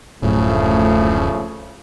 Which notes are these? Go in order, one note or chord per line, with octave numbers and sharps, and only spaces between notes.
D1 F#2 A2 C#3 F3 A3